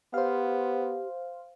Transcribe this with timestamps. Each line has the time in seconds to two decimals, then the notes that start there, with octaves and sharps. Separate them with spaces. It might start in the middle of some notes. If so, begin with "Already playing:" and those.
0.14 B3 G4 C5 F5